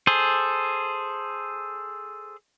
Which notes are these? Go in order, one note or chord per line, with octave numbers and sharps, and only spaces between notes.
G#4 A4 C5